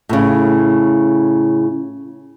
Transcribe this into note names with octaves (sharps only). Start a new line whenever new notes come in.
A2 C#3